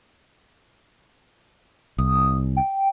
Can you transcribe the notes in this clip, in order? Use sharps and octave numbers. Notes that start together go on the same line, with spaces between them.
C2 D#6
G5